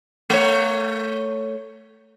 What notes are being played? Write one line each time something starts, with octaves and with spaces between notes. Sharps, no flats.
A3 C#5